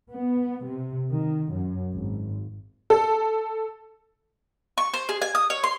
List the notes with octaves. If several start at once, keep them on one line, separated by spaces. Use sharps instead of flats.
B3
C3
D#3
F#2
G#1
A4
C#6
C5
G#4
G#5
D#6
C#5
C6